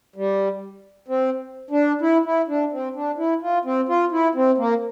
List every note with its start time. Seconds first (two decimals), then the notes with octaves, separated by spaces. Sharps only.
0.16 G3
1.08 C4
1.71 D4
2.01 E4
2.25 E4
2.48 D4
2.72 C4
2.95 D4
3.18 E4
3.42 F4
3.65 C4
3.89 F4
4.12 E4
4.35 C4
4.58 A#3